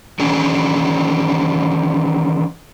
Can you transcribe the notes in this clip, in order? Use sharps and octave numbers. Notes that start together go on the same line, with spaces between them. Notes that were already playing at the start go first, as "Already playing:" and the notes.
D#3 E3 F#3 C#4 D4 G#4